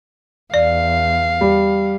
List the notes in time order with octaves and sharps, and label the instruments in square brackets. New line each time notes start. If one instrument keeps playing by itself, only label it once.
[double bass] E2 [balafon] D5 [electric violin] F5
[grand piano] G3